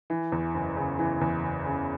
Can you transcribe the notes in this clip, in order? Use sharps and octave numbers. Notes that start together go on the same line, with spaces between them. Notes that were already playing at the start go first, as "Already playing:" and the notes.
E3
E2
F#1
C#3
E3
E2
F#1
C#3